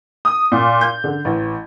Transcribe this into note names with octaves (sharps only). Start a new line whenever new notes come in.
D#6
A#2
G6
D3
A1